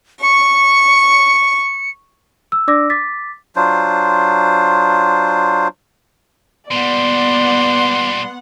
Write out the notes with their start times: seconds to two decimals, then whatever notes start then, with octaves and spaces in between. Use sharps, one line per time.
0.22 C#6 C#7
2.52 E6
2.68 D4 D5 D6 E6 A#6
2.90 D6 A6 B6
3.56 F#3 D4 F4 C5
6.71 A#2 G3 B3 D5 F#5 C6